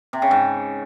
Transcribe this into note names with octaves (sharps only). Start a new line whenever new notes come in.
C3
C#3
G#2